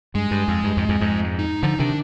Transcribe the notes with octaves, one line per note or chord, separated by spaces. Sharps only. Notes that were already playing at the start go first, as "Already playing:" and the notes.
G2 G#3
G2
F2
G2
F2 G#2
F2 G#2
F2 G#2
D#4
D3 F3 D#4
C3 D#3 D4